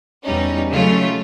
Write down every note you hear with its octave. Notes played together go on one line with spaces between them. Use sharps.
E2 G3 C#4 D#4
C#3 F#3 A3 F4